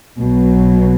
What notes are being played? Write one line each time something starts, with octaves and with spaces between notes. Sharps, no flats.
B1 B2 F#3